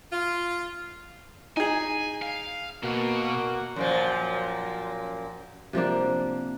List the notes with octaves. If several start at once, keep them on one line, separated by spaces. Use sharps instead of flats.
F4
D#4 G#4 G#5
F5
B2 A#3 F#4
F#2 A#2 F3
C3 F3 A#3 D4